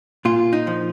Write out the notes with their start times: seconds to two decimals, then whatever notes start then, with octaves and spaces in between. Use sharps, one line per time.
0.25 A#2 F4
0.53 D#4
0.67 F3